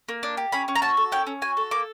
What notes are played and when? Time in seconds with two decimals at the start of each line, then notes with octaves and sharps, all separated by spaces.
0.09 A#3
0.23 D4
0.37 G4
0.52 C#4 B5
0.68 C#4
0.76 A#5
0.82 F#4 A5
0.97 A4
1.12 C#4 G5
1.27 C#4
1.42 F#4 G#5
1.57 A4
1.71 A#3 D6